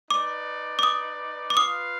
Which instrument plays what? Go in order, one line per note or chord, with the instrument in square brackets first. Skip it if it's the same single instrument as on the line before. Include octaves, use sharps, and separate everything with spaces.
[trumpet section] D#4 B4 D5 [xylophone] D6
[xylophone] D6
D#6
D6
[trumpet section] F4 B4 F5 [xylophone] D#6